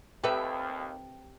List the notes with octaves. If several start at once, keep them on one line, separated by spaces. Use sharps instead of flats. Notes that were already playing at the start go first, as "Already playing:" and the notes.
D#2 C4 G4 A4 B4 E5